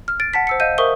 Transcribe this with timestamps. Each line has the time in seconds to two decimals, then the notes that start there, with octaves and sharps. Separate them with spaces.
0.08 F6
0.20 A6 D7
0.33 F#5 A5 B6
0.47 C5 E6 C#7
0.60 D#5 F5 G6 D#7
0.78 A#4 C5 E5 C#6 D#6 G7